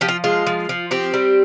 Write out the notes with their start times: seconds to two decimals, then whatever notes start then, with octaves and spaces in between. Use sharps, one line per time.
0.01 F3 G4
0.08 F4
0.24 G#3 F4
0.47 F3
0.69 F3
0.91 C4 G4
1.14 G3